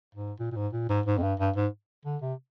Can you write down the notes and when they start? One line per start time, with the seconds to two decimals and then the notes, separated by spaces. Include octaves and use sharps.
0.15 G#2
0.40 A#2
0.52 A#2
0.56 G#2
0.73 A#2
0.89 G#2
1.06 G#2
1.18 F2
1.23 G2
1.39 G2
1.56 G#2
2.05 D3
2.22 C3